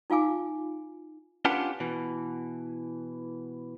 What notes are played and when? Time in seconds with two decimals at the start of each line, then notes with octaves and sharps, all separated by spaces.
0.10 D#4 F4 F5 G#5 D6
1.45 C#4 D4 F4 G4 B4 F#5
1.80 B2 E3